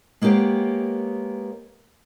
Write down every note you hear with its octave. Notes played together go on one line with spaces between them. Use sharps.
G#3 A#3 B3 G4 C#5